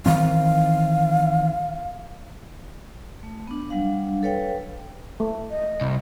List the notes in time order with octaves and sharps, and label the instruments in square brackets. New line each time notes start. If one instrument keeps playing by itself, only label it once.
[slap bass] D#3 E3 C4 [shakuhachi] F5
[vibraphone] A3
B3 D4
F#3 G3 D4 F5
A4 B4 C#5 F5 G5
[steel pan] A3
[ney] D#5
[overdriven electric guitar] C2